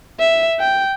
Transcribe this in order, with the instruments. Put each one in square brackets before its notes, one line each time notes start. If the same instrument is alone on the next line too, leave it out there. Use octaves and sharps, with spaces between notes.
[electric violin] E5
G5